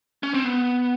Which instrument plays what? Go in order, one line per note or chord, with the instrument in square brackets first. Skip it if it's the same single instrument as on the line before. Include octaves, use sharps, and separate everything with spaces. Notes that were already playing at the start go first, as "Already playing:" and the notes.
[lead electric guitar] C#4
C4
B3